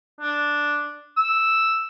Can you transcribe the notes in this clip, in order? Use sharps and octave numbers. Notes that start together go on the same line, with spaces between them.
D4
E6